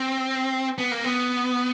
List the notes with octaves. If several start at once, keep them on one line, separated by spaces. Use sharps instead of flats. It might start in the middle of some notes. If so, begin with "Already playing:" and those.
Already playing: C4
B3
A#3
B3